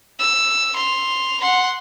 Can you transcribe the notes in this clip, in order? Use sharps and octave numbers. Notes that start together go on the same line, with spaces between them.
E6
C6 F7
F#5 C6